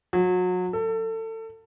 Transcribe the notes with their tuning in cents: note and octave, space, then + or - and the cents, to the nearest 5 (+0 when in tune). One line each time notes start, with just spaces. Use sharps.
F#3 -30
A4 +25